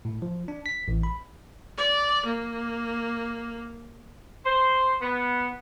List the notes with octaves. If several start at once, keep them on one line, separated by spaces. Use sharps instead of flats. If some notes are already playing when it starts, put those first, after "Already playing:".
A2
F3
D4
B6
A1
B5
D5
A#3
C5
B3